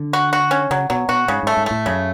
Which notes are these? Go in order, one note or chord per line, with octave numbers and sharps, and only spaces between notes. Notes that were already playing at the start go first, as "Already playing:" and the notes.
Already playing: D3
F#4
F#4
C#4
C#3 F#3
B2 F#3
B2 F#4
G#2 C#3
G#2 A3
G#2
A2 A3
F#2 C#3